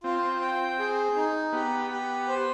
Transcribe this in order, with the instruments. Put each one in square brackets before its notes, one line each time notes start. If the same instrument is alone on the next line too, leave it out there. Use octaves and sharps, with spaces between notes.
[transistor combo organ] C4 [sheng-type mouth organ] F4
[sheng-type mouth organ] G5
G#4
D#4
[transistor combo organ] B3 [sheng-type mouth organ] G4
[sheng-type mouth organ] G4
C5